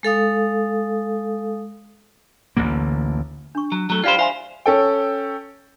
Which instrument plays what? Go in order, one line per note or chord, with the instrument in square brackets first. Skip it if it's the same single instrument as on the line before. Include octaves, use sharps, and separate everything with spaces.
[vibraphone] G#3 A4 F5 D#6
[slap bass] A1 D2 D3 A#3
[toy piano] D4 C#6
[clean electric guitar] F#3
F#3 A3
[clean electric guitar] F4 G4 C5 [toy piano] D5 F5 B5
[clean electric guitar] C5 F5 [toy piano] E5 G#5 C6
[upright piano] C#4 A4 G5